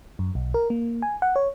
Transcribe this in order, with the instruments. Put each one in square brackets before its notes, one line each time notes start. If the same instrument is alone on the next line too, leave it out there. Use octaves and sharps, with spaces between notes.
[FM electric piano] F#2
B1
A#4
A#3
G#5
F#5
C#5